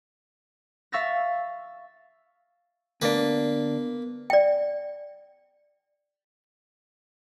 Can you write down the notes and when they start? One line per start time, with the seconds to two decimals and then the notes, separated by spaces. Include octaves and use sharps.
0.92 E5 F5 C#6 E6 A6 A#6
3.02 D2 A#3 B3 D4 B4
4.30 D5 G5